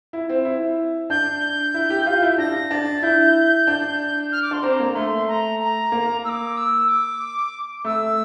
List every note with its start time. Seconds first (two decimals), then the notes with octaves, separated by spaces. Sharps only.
0.13 E4
0.29 C4
0.45 E4
1.10 D4 G6
1.74 E4
1.90 G4
2.06 F4
2.22 E4
2.38 D4 A#6
2.71 D4 A6
3.03 E4 G6
3.67 D4
4.32 F6
4.42 D6
4.51 D4 C6
4.63 C4 A#5
4.80 A#3
4.95 A3 C6
5.28 A#5
5.59 A#5
5.92 A#3
6.24 E6
6.29 D6
6.56 E6
6.88 D6
7.84 A3 E6